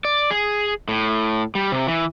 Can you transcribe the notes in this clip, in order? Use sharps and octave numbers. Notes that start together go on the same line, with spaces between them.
D5
G#4
A2
G3
C3
E3